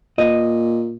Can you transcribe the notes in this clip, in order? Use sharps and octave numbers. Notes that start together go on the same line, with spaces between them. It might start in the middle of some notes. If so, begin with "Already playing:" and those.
A#2 D#5